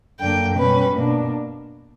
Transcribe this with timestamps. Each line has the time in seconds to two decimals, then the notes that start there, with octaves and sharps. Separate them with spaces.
0.20 F#2 D3 A#3 D4 G5
0.58 B2 G3 C#4 B4
0.95 B2 A#3 D4